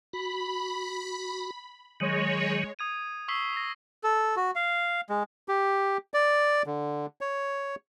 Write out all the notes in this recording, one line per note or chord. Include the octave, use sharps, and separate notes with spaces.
F#4 B5
D#3 F#3 G#3 C#5
D#6 G#6 D#7
C#6 D#6 E6 B6 C7 G7
D#6 A#6
A4
F#4
F5
G#3
G4
D5
D3
C#5